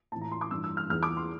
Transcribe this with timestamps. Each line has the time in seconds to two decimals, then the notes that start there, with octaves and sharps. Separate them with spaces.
0.12 A2 A5
0.16 E3
0.21 A#5
0.31 C6
0.41 D6
0.51 G2 E3 E6
0.64 E6
0.77 F6
0.90 E2 E3 F6
1.03 D6
1.17 C6